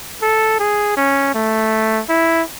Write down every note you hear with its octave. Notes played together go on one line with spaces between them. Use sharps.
A4
G#4
C#4
A3
E4